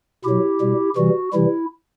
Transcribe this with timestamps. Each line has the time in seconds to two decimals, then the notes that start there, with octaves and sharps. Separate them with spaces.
0.25 B2 F#3 E4 G4
0.61 B2 G3
0.96 C3 E3 G3 F#4
1.33 C3 E3 G3 E4